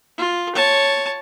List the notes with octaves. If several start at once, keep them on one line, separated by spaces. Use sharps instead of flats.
F4
C#5 A5